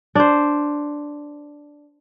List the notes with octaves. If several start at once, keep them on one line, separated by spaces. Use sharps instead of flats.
D4 C5